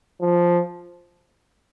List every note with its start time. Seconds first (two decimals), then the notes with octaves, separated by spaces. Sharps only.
0.21 F3